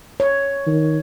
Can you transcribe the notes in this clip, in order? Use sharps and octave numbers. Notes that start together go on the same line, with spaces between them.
C#5
D#3